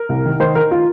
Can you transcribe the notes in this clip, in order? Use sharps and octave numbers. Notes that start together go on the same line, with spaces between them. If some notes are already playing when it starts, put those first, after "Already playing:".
Already playing: A#4
C2
D#3
D#3 C5
D#3 A#4
F4